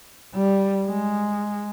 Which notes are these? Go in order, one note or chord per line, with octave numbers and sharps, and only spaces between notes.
G3
G#3